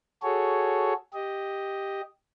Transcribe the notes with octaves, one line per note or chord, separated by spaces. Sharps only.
F#4 G#4 A4 C#5
G4 D#5